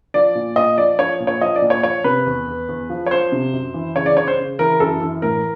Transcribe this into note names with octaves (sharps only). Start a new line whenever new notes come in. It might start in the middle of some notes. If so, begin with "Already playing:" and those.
F3 D5
A#2
A#2 D#5
F3 D5
F3 C#5
A#2
C#5
F3 D#5
D5
A#2
C#5
F3 C#5
C3 B4
E2
E2
E2
F3
C#5
F3 C5
C3
F#2
E3
C#3 C#5
D5
C#3 C#5
C5
C#3
E3 A#4
F#2 A4
E3
A2 A#4